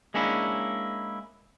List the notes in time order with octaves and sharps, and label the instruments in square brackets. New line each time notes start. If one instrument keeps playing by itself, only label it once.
[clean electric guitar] G#3 A#3 C#4 D4 E4